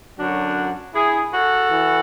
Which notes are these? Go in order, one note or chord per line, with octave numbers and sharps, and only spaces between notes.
F#2 D3 F#3 D4 F#4
E4 G#4
F#4 A4
E3